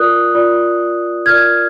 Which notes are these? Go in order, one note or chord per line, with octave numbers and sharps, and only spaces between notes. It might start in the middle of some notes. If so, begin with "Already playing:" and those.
Already playing: F4 A#4 D5 D#6 F#6
F4 A#4 D5
F4 A#4 D5 F6 G#6